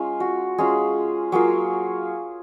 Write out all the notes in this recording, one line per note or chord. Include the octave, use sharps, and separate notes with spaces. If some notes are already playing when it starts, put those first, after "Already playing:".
Already playing: G#3 C#4 F4
F#4
G#3 C#4 F4 G#4
F#3 A#3 F4 G#4